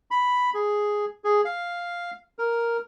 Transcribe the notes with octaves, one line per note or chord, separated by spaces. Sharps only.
B5
G#4
G#4
F5
A#4